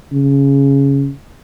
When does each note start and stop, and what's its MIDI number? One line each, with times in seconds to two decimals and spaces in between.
0.13 1.10 49